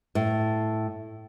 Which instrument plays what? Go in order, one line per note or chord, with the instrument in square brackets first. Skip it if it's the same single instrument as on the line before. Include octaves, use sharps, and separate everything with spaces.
[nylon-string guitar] A2